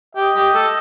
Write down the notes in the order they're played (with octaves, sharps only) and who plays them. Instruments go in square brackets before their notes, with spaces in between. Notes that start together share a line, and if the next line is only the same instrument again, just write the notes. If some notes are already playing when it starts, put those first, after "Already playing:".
[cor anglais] G4 [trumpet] D#5
[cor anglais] G4
A4